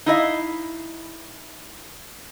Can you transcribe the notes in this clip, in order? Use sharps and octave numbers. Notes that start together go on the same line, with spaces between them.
D#4 E4 D#5 F5